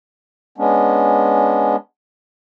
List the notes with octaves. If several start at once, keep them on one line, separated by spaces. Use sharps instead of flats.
G#3 B3 C#4 D4